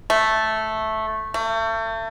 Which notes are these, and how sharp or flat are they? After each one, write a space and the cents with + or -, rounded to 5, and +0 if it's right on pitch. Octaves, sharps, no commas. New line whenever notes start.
A3 -5
A3 +35